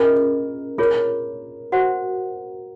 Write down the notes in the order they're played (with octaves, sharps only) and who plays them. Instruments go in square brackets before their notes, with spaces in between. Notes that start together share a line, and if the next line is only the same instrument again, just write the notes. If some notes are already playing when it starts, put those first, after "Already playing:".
Already playing: [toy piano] C#4 F4 G#4 D#5 [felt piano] A#4
[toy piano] F4 G#4 C#5 [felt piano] A#4
[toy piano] F#4 C5 F#5